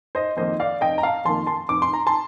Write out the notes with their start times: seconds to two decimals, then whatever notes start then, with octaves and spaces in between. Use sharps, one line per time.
0.15 C5 D#5
0.37 F2 D#3 A#3 C5 D#5
0.60 D5 F5
0.81 F1 D#5 G5
0.98 A#5
1.03 F5 A5
1.25 F2 D#3 A#3 A5 C6
1.47 A5 C6
1.69 F1 D6
1.82 C6
1.93 A#5
2.07 A5 C6